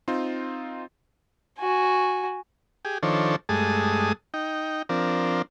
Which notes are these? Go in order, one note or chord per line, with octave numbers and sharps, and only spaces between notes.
C4 D#4 F4
F#4 G#5
G4 G#4
D#3 F3 D4 A4 C5 C#5
G2 G#3 A3 G#4 A5 D#6
D#4 G5
F3 C4 D4 A#4